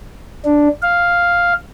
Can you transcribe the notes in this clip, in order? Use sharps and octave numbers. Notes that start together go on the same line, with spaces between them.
D4
F5